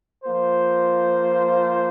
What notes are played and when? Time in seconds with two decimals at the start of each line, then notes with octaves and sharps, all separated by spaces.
0.24 F3 A#3 F4 C5